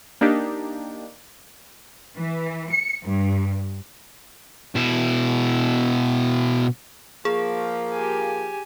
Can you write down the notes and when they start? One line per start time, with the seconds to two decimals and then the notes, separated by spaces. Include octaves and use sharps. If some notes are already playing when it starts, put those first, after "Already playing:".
0.21 A#3 D4 D#4 G4
2.16 E3
2.72 C#7
3.03 G2
4.75 B2 E4
7.25 F3 A#3 G#4
7.93 G4 G#5